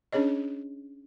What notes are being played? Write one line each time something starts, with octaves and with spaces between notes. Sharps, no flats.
C#4 D4 G#4 C#5 D#5